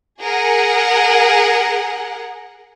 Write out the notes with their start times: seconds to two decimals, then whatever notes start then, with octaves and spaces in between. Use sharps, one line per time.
0.22 G#4 A#4 F#5